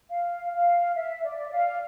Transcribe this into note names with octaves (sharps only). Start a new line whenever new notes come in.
F5
F5
E5
D5
F5